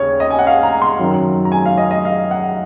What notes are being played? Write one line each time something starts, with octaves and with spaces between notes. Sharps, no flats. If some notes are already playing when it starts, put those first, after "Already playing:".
Already playing: D#2 C#3 C#5
D#5
G#5
F#5
F5
A#5
C6
F#2 D#3 F#3
A#5
G#5
F5
D#5
D#5
F5
F#5